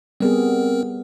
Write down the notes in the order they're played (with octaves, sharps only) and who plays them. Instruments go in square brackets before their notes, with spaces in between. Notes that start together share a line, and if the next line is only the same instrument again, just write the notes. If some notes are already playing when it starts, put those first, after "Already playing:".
[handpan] G3 B3 G#4 [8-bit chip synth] C4 A#4